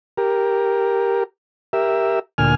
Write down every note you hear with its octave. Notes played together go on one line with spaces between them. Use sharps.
G4 A#4
G4 A#4 E5
D2 A#2 G#5 F6